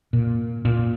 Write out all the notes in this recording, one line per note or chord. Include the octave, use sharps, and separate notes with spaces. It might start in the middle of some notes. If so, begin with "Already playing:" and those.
A#2
A#2